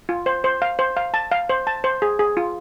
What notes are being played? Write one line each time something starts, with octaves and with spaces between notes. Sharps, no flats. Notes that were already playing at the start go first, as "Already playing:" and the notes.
F4
C5
C5
F5
C5
F5
A5
F5
C5
A5
C5
G#4
G#4
F4